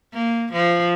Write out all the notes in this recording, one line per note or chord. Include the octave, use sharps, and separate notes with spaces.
A#3
F3